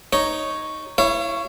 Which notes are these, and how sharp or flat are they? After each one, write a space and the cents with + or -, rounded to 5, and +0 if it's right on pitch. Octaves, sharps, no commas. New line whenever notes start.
D#4 +0 C#5 +0
E4 +0 C#5 +0 F5 -45